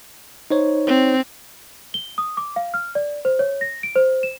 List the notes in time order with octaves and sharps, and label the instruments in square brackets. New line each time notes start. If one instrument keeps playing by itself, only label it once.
[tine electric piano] D#4 C5 C#5
[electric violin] C4
[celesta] G7
D#6
D6
F5
F6
D5
C5
C#5
A#6
D7
C5
E7